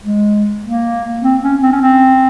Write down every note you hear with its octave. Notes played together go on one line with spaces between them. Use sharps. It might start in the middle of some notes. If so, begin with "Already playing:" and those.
G#3
A#3
C4
C#4
C4
C#4
C4